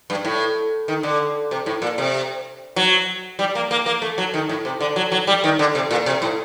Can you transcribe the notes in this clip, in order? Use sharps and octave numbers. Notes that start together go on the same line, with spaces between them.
G2
A2
D#3
D3
C3
A2
A#2
C3
F#3
G3
A#3
A#3
A#3
A3
F#3
D#3
A2
C3
D3
F#3
F#3
G3
D#3
D3
C3
A#2
C3
A2